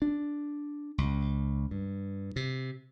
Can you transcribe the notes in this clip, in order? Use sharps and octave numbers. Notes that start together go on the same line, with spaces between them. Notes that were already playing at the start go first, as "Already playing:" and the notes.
D4
C#2
G2
C3